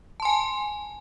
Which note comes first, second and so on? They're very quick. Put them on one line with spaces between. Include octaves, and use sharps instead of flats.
A5 C6 G#5